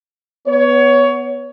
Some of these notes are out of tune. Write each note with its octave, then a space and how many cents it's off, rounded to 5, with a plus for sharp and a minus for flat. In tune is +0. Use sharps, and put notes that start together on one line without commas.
B3 +0 C#5 +20